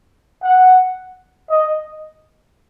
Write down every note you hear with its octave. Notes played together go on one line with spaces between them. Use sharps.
F#5
D#5